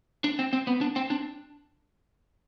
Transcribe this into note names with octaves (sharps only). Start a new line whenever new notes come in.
D4
C4
C4
B3
D4
C4
D4